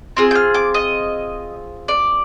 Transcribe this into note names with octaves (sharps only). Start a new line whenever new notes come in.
C4 F4 G#4
G6
F6
D6
D#5
D5